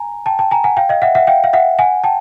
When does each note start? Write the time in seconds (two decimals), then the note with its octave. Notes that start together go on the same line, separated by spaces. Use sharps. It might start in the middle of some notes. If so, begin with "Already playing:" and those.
Already playing: G#5 A#5
0.26 G5 A5
0.39 G5 A5
0.51 G#5 A#5
0.64 F#5 G#5
0.77 F5 G5
0.89 D#5 F5
1.02 E5 F#5
1.15 E5 F#5
1.27 F5 G5
1.44 F5
1.53 E5 F#5
1.79 F#5 G#5
2.04 G5 A5